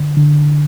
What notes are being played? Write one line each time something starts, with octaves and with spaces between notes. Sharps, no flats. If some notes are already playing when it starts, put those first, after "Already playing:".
Already playing: D3
D3